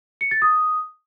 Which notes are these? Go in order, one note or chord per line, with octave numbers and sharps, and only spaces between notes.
C#7
A6
D#6